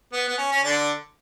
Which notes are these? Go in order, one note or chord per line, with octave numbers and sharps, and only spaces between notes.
B3
B3
C#4
C#4
D3 D4